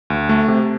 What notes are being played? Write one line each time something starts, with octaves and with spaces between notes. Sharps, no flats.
D2
A3
C3